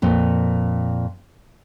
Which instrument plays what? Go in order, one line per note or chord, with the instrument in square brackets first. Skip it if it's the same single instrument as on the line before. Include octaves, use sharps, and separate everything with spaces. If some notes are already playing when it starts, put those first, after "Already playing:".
[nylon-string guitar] F2 A#2